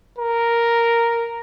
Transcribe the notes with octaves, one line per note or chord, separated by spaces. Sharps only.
A#4